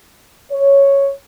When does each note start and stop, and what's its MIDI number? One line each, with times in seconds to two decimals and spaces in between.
0.52 1.09 73